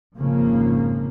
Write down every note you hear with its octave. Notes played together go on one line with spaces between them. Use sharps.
G#1 F2 G#2 C#3 F3 A#3